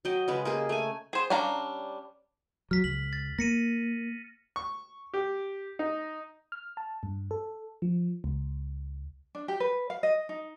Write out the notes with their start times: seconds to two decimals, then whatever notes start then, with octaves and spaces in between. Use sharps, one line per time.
0.05 F#3 D#5 G5
0.28 C#3 G#3 B4
0.45 A#3 G4 G#4
0.69 A3 G#5
1.13 G#4 C5
1.30 G3 C#4 D4 F5 A#5
2.71 F#3 F6 B6
2.84 C#2 F#7
3.13 A6
3.39 A#3 A#6 C#7 D#7
4.56 C#6
5.14 G4
5.79 D#4
6.52 F6
6.77 A5
7.03 G2
7.31 A4
7.82 F3
8.24 C#2
9.35 D4
9.48 G4
9.60 B4
9.90 F5
10.03 D#5
10.29 D#4